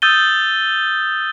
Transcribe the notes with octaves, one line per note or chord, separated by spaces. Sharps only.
D#6 E6 G6 A6 D#7 G7